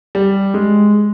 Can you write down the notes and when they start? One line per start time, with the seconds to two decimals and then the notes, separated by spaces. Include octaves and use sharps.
0.15 G3
0.54 G#3